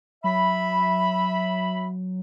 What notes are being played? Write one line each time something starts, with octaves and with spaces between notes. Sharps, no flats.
F#3 E5 B5